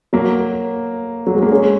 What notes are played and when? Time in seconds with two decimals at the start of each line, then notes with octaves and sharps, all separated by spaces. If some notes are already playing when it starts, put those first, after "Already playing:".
0.13 F#3 A#3
1.27 F#3
1.35 G#3
1.42 A#3
1.51 G#3 C#4